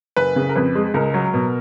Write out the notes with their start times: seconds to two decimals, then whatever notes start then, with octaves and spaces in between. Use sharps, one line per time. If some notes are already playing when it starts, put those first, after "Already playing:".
0.16 F#1 B4
0.36 C#3
0.49 A#4
0.56 F2 B4
0.75 G#3
0.94 C#2 A#4
1.14 F#3
1.34 B2